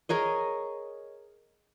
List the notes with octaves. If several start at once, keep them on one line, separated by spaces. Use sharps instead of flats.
G#4 A#4 C#5 D#5